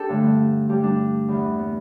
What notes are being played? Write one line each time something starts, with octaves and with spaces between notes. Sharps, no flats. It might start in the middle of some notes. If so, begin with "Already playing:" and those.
Already playing: D4 G4 A4
G2 D3 A3
G2 G3 G4
D4
E2 E3 G3
B3